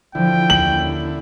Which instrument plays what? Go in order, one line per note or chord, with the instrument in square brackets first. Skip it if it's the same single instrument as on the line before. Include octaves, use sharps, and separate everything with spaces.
[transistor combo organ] D3 E4 [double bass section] E3 F3 [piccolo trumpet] G5
[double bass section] D#2 C#4 [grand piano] F#7